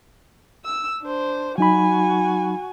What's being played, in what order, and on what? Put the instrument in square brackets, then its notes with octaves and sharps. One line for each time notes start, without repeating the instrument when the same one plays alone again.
[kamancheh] E6
D4 C5
[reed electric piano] F#3 D#4 B5 [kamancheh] F#4 G#5